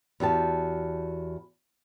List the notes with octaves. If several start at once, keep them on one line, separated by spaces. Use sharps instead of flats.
E2 F#4 G4 A5